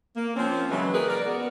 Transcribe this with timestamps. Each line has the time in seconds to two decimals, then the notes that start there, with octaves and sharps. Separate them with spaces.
0.15 A#3
0.36 F3 C4 C#4
0.71 C#3 E3 F#3 G#3
0.93 A#3 G#4 A#4 B4
1.08 A#4 D5
1.26 B3 F#4